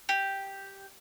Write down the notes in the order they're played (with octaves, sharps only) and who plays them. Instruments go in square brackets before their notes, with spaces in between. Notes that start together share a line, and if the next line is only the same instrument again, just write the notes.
[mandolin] G4